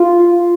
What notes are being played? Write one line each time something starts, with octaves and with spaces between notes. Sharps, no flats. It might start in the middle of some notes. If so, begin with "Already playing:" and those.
Already playing: F4